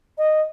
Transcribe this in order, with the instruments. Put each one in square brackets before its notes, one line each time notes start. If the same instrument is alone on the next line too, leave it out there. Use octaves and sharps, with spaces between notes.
[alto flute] D#5